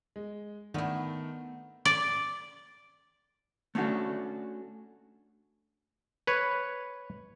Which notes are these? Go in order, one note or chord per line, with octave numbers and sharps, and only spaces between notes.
G#3
D#3 A3 B3 D4 E4
D5
A3 C#4 D4 F#4 A4
B4 C#5